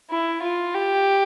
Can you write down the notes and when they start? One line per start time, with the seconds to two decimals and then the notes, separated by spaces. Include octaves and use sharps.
0.10 E4
0.42 F4
0.75 G4